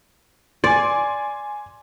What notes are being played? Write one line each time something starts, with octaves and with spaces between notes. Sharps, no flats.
D5 G#5 C6